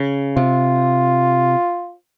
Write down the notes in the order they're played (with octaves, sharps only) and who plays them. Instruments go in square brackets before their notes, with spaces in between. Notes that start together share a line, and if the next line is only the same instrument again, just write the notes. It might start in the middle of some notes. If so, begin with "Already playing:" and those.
Already playing: [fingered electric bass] C#3
[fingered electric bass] C3 [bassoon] F4